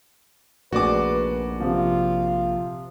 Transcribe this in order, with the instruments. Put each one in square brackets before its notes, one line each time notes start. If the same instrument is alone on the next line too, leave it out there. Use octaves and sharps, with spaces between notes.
[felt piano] F1 G#4 [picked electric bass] A#1 [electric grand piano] F#4 D5 D6 [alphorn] B4
[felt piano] C3 F3 [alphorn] F4